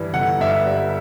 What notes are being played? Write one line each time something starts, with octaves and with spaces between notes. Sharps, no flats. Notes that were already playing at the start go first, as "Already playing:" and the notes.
Already playing: G2 E3 G3
G1 F#5
G2 E5
G3